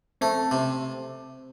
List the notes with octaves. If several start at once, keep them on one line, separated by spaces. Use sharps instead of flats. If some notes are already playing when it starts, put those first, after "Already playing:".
A3 C4
C3